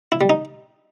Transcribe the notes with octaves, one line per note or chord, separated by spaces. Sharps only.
E4
G3
D#4